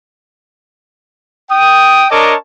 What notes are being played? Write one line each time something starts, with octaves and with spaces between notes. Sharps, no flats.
G5 D#6
D4 A#4 C#5 D#5 A5 D6